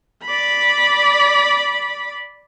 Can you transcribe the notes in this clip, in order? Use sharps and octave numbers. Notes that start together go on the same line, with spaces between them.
D5 B5